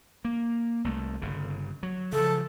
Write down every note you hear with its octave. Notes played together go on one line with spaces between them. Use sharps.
A#3
C2 A3
G1 C#3
F#3
C#3 F3 A4